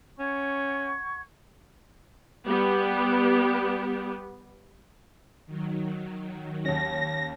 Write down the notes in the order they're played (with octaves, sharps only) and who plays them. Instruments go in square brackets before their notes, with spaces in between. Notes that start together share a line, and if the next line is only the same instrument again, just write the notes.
[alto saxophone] C#4 [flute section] F#5 C#6 G#6
[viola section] G3 B3 G4
[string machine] D#3 F#3
[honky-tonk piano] D#2 C#4 [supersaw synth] A#6